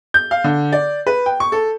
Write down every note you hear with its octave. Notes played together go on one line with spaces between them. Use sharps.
G6
F5
D3
D5
B4
G5
C#6
A4